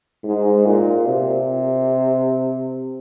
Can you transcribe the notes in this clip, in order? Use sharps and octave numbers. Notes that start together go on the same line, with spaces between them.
G#2
A#2
C3